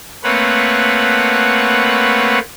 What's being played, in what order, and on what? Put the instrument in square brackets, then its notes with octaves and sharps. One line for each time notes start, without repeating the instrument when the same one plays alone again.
[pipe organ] A3 A#3 C4 B4 C#5 F#5